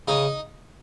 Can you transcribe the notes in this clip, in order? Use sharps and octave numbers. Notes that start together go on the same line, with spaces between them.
C#3 D#4